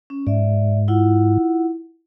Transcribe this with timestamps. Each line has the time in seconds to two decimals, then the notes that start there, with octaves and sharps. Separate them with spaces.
0.10 C#4
0.27 G#2 D5 E5
0.88 E4 F4 F#5